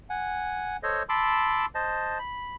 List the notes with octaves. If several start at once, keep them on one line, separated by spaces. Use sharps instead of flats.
F#5 G#5
A4 C5 C#5 D#5
A5 B5 C6 D6 E6
C5 D#5 A5
B5